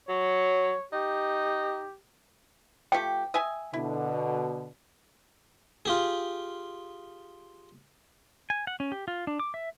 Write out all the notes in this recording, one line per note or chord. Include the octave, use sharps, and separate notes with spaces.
F#3 C#5
D#4 G4
F3 A3 G4 G5
D#5 E5 G#5
B2 D3 E4
F4 G4 G#4
G#5
F#5
C#4
G4
F4
D4
D6
E5